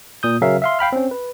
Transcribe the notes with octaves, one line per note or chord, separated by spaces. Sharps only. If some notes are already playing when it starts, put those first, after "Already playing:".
A#2 D#6 G6
C#3 F#3 C#4 A#4 E5 F5
E5 F5 C6
F5 G5 B5 F6
C4 C#4
B4